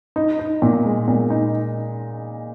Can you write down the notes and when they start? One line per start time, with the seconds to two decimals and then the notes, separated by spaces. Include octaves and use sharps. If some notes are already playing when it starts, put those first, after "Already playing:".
0.16 D#4
0.39 D#4
0.62 A#2
0.85 G#3
1.08 A#2
1.30 D#4